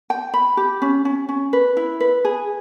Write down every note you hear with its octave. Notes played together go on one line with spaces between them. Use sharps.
G5
B5
G4
C#4
C#4
C#4
B4
E4
B4
G#4